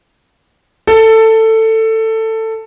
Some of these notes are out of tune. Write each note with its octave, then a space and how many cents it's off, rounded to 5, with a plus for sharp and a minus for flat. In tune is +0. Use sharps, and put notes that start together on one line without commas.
A4 +15